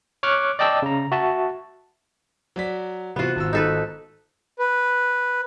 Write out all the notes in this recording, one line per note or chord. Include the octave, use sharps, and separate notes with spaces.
C#5 C#6 D6 F6 F#6
D5 D#5 G5 A5 E6
C#3 A#5
F#4 E5 A5
F#3 D5 B6
C3 E3 B3 F4 F#4
G#1 F#4 E6
D#4 A4 B4
B4